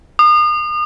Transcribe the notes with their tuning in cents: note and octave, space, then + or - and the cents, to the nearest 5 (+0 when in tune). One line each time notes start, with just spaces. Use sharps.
D#6 -40